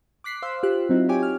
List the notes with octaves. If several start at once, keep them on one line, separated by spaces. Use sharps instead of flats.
D6 F#6 B6 C7
C5 F5 C6 E6
F4 G4 F#6
F#3 C4 D#4 E4
G4 C#5 G5 G#5 D6
F6